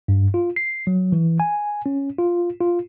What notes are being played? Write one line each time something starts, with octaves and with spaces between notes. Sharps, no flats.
G2
F4
C7
F#3
E3
G#5
C#4
F4
F4